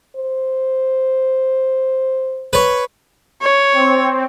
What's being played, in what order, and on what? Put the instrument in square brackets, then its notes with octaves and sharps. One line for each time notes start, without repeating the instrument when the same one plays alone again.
[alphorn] C5
[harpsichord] B4 C#5
[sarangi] C#5
[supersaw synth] C4